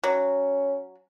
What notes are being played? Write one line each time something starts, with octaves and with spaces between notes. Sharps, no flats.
F#3 C#4